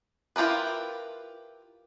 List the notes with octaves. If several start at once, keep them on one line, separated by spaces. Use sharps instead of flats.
E4 F4 G4 A#4 B4